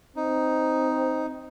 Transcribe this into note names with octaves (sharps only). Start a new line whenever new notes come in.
C4 D#4